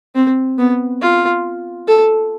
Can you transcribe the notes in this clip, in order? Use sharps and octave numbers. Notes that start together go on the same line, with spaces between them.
C4
B3
F4
A4